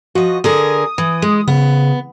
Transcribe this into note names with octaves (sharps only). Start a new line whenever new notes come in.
F3 F#4 D#5
D3 G#4 A#4 D#6
E3
G#3
C#3 B3